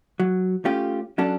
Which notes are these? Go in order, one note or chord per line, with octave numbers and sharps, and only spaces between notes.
F#3
A3 C#4 F4 G4
F#3 C#4 D4 A4